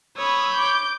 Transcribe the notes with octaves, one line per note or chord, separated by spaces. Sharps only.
C#5 B5 D#6 E6
D6 G6